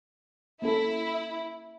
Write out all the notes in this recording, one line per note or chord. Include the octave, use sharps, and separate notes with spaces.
A#3 C#4 E4 A4